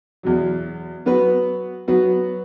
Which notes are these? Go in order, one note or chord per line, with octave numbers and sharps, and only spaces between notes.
E2 B2 F#3
F#3 B3 F#4 B4
F#3 B3 F#4 B4